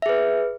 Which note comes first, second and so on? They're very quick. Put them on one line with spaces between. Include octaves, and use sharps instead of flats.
E5 G#4 B4